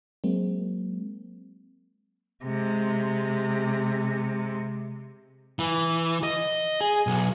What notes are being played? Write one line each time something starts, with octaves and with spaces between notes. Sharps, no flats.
F#3 G#3 A#3 C4
C3 G#3
E3
D#5
G#4
B1